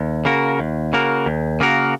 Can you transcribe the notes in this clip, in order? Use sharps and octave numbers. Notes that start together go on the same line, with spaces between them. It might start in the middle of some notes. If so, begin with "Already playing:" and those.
Already playing: D#2
C#3 A#3 F#4 A#4
D#2
C#3 A#3 F#4 A#4
D#2
C#3 A#3 F#4 A#4